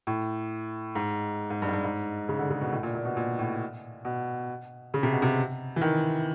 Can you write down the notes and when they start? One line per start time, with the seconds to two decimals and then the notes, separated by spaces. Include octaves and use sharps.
0.07 A2
0.95 G#2
1.50 G#2
1.62 G2
1.68 G#2
1.73 G2
1.84 G#2
2.29 C#3
2.39 D3
2.50 C#3
2.61 B2
2.72 A2
2.83 A#2
2.95 A#2
3.05 B2
3.17 A#2
3.39 A2
4.05 B2
4.94 C#3
5.03 C3
5.12 B2
5.22 C3
5.76 E3
5.82 D#3